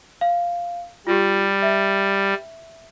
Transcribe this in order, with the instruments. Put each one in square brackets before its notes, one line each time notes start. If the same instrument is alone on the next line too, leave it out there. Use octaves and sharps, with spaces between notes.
[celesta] F5
[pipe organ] G3 [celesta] F4 G4
[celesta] E5